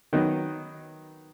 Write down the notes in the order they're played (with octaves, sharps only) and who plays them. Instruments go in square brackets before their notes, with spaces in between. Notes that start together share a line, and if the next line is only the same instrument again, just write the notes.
[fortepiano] D#3 F#3 B3 D#4